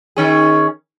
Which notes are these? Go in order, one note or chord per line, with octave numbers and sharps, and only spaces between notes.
D#3 C#4 G#4